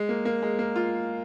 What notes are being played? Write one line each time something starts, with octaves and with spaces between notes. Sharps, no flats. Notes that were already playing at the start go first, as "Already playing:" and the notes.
Already playing: G#3
A#3
A#3
G#3
A#3
F4